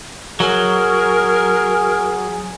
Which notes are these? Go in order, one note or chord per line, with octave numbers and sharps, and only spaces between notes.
F#3 G#4 A#4